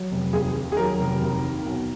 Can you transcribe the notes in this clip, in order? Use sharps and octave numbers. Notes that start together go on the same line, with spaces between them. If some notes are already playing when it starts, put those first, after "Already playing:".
Already playing: F#3
F1
D#2 G#4
D#3
G#4
F#3 A#4
F1
D#2
D#3
B1